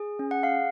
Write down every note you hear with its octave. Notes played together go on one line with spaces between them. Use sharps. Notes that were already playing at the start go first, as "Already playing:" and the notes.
Already playing: G#4
C#4
F#5
F5